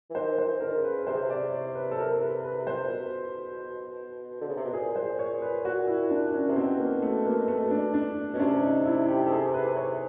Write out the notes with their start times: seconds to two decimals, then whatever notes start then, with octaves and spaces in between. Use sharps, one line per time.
0.10 E3
0.15 D#3 C5
0.38 C5
0.46 E3
0.53 D#3
0.60 D3 A#4
0.67 D#3
0.76 C#3
0.84 B4
1.07 C3 C5
1.14 C#3
1.21 C3
1.30 D5
1.53 C#5
1.75 B4
1.91 A4
1.99 A#4
2.11 A#4
2.21 B4
2.44 B4
2.67 C5
2.83 A#2
2.90 B2
4.41 D3
4.48 C#3
4.57 C3
4.65 B2
4.73 A#2 G#4
4.96 C5
5.19 C#5
5.42 B4
5.65 F#4
5.87 E4
6.10 D4
6.34 C#4
6.49 C3
6.56 B2 C4
6.79 A#3
7.02 A3
7.25 A#3
7.48 A3
7.71 D4
7.94 D4
8.33 B2
8.35 C#4
8.39 C3 D4
8.63 D#4
8.85 E4
9.08 G4
9.26 A4
9.31 G#4
9.54 B4
9.76 C#5